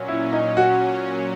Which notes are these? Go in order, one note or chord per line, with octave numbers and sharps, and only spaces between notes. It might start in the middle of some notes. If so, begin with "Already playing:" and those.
Already playing: A#2 F#3 C#4
E4
D#4
F#4